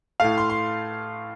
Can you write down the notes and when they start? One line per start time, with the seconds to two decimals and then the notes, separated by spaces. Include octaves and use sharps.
0.20 A2 A3 F5
0.38 C6
0.50 C6